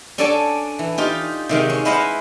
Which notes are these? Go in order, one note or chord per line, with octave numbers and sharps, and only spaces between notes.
C#4 D4 A4 D5 G#5 A5
E3
D#4 F4 G4
C3 D#3 G#3
C#4
E4 B4 C5 D#5 F5 F#5